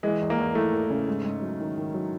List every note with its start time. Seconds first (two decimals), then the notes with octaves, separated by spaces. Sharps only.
0.03 E3 G#3
0.21 E2
0.30 A#3
0.39 E2
0.55 E2 A3
0.73 E2
0.90 C#3
1.08 G#2
1.25 G#2
1.42 F#3
1.60 D#3
1.77 D#3
1.94 F#3